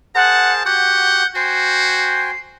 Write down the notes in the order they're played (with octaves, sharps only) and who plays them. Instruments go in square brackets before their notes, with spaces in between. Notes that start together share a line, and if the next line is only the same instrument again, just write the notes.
[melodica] G#4 A#4 C5 [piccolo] F#5 [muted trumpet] A5
[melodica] F#4 G4 [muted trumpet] F#5 [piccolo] G6
[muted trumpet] F#4 [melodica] C5 G5 G#5 [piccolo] C7